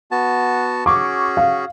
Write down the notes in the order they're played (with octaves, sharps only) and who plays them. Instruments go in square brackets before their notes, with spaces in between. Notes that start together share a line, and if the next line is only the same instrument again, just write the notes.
[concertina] B3 F#4 A5
[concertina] C#4 F#4 G#4 [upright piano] C#6 D6
[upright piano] F5